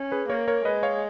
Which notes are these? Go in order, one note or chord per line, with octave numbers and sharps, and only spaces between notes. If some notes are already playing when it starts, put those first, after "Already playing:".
Already playing: C#4
G#4 B4
A#3 A#4 C#5
A#4 C#5
G#3 B4 D#5
C#5 F5